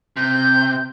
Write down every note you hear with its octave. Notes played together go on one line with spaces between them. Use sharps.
C3 G6